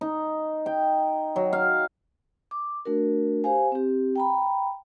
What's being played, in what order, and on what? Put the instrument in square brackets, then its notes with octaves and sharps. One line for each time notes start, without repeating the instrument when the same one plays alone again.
[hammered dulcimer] D#4
G5
F#3
F5
[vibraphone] D6
A3 D4 F#4 A#4
G4 C5 F5 G#5
C4 G4
G5 A#5 B5